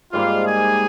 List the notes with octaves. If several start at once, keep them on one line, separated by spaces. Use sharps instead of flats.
G#2 G3 A#3 F4 F5
G#4 G#5